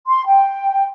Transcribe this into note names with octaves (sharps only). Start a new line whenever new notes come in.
C6
G5